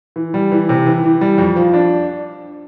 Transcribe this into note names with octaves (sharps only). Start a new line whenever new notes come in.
E3
G3
E3
C3
E3
E3
G3
F2
F3
D4